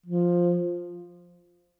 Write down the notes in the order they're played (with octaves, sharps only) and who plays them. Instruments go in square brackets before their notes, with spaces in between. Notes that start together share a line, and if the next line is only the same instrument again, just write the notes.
[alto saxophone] F3